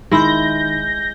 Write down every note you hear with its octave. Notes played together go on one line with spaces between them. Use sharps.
D#3 G#3 E4 G6 A#6